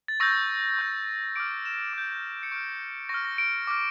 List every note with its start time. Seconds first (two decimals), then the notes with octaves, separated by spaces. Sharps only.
0.08 A6
0.20 C#6 E6 G6 A#6
0.79 C#6 E6 G6
1.36 D6 F6 D7
1.65 E7
1.93 D6 G6
2.43 C#7
2.52 C#6 F6 D7
3.09 C#6 F6 A#6
3.25 A#6
3.38 D7
3.67 D6 F6